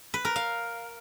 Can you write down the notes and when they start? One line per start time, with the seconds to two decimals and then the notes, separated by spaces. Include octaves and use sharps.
0.14 B4
0.25 A#4
0.36 F5